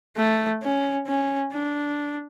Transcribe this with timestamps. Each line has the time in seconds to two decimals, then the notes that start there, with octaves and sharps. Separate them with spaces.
0.16 A3
0.63 C#4
1.07 C#4
1.52 D4